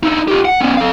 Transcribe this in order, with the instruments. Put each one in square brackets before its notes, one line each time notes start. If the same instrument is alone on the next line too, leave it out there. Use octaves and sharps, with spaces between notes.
[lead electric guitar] D#4 E4
F4 G4
F#5
B3 C#4
A4 F5